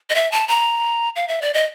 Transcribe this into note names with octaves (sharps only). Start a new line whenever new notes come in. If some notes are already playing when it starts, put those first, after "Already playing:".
D#5
E5
A5
A#5
F5
E5
D5
D#5